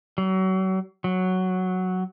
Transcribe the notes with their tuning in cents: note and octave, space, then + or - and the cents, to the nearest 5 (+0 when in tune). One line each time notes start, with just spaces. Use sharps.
F#3 +35
F#3 +0